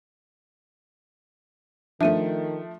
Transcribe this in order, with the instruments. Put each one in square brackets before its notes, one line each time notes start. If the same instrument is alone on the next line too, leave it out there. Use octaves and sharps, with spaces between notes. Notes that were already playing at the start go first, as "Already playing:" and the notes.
[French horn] D#3 [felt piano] F3 A3 [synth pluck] D4 [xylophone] E5 D#7